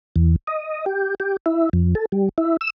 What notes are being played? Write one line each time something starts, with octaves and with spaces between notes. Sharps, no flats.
E2
D#5
G4
G4
E4
F2
A4
G3
E4
E6